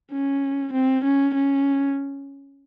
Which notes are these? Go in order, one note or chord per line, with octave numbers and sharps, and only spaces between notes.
C#4
C4
C#4
C#4